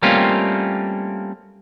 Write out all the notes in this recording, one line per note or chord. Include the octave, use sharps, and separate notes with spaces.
G3 A3 A#3 C4 C#4 F4